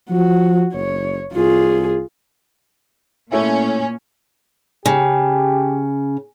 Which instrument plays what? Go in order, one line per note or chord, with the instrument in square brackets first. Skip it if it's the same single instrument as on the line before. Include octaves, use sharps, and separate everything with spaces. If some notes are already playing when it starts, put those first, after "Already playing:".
[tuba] F3 [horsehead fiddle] F#4
[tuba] F#1 [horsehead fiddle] C#5
[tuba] C2 [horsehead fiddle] F4 G#4
[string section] A#2 C#4 [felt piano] A3 E4 E5
[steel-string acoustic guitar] C#3 [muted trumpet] G4